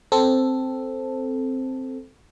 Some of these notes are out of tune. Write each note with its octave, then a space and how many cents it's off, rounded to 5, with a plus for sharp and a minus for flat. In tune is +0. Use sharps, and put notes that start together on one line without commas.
C4 +0 A4 +0